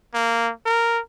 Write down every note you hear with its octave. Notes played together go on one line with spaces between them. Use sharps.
A#3
A#4